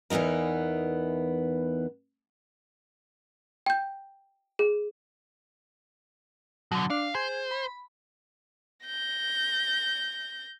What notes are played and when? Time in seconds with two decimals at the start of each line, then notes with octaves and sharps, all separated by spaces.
0.10 E2 E3 B3 D#4 A#4
3.66 G5 G6
4.59 G#4
6.72 B2 D3 F#3
6.90 D4 F5
7.15 G#4 C5
7.51 B5
8.86 G6 A#6